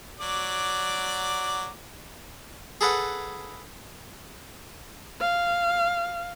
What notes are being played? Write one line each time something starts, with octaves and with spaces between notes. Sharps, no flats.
F#3 D5 D6
G#4 A4 B4 F#5
F5